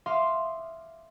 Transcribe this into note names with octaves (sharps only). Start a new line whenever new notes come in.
E5 F5 C6 D6 D#6